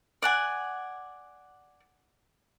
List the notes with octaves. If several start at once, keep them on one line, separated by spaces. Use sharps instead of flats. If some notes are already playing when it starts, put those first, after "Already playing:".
D5 F#5 G#5